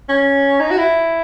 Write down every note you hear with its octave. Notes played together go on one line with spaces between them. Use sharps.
C#4
D#4
F#4
E4